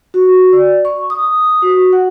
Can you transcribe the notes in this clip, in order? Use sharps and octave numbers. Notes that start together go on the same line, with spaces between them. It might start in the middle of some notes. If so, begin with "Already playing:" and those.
F#4
D5
C#6
D#6
F#4
F#5